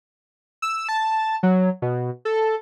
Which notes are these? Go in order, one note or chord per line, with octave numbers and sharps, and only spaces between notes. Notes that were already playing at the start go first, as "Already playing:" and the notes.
E6
A5
F#3
B2
A4